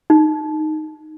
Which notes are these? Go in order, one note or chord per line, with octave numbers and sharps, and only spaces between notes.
D#4